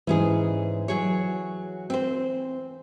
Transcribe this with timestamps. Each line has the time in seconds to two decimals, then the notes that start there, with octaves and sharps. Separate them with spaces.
0.07 G#2 E3 C#4 G#4
0.88 F#3 G#4 C#5
1.90 C4 C5